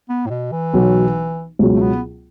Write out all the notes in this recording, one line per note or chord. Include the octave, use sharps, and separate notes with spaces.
B3
A2
B2
E3
B1 B2 F#3
C#2 B2 F#3
A3
B3